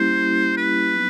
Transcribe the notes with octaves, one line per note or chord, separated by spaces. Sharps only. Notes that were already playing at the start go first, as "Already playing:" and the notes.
Already playing: G3 A#3 C#4 E4 G4 C5
B4
F#3 B3 D#4